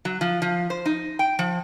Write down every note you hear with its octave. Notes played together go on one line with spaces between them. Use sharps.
F#3
F3
F3
C5
D#4
G5
F3